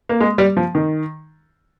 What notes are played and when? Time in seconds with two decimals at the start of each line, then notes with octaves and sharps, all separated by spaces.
0.09 A#3
0.20 G#3
0.38 G3
0.57 F3
0.75 D#3